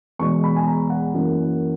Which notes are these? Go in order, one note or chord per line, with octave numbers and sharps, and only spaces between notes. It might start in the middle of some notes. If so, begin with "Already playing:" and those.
E2 B2 G#3 C#6
B5
G#5
A#5
F#5
F#2 E3 A#3